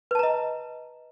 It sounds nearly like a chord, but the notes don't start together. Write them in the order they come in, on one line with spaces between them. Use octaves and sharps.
B4 A5 A#5 D#5